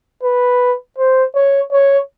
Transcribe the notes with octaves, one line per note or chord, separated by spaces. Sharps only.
B4
C5
C#5
C#5